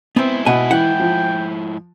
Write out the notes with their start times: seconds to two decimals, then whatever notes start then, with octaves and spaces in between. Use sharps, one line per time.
0.16 G#2 B3 C4 E4
0.46 B2 D#5 F#5 G#5
0.71 E3 F#5 G5
1.00 F3